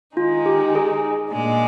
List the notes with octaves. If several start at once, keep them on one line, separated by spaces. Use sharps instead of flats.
D#3 G#3 D#4 F4
G4
G#4
A#2 G#3 D4